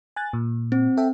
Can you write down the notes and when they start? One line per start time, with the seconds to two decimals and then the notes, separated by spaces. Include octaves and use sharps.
0.16 G#5 F#6 A6
0.33 A#2
0.72 C4
0.97 A4 E5 G5